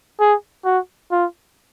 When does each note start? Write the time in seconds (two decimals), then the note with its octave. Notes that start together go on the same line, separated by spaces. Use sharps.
0.20 G#4
0.65 F#4
1.12 F4